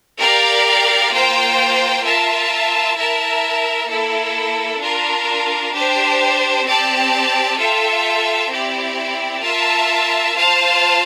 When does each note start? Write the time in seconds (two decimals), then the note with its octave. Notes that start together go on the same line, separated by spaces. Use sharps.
0.19 G4 A#4 D5 F5
1.12 A#3 F4 C5 G5
2.04 F4 A#4 E5 A5
2.97 E4 A#4 E5 A5
3.88 A#3 E4 A4
4.80 D4 F4 A#4
5.74 D4 G4 C5
6.65 C4 G4 D5 A5
7.58 F4 A4 E5 G5
8.50 C4 E4 G4 D5
9.42 F4 A#4 E5 A5
10.34 F4 C5 F5 A5